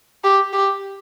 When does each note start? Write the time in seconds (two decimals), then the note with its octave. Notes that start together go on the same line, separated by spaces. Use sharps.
0.24 G4
0.53 G4